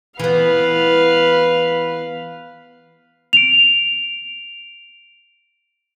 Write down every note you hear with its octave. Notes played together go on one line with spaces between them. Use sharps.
E3 B3 B4 F5
D7 F7